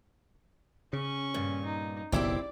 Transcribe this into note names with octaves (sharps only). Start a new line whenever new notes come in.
C#3 C#4 C#6
G2 A#2
D#4
F#1 B1 B2 C4 E4 G4 D5